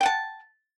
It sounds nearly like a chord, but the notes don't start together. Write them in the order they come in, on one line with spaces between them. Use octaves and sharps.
G5 F#5 A5